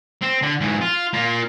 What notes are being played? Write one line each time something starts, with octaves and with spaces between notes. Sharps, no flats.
C4
D3
G#2 E3
F4
A#3 F4